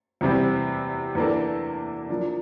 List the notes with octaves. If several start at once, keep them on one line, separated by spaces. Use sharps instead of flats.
E2 C3 G3 C4
E2 E3 A#3 D4 A4
F3 A#3 D4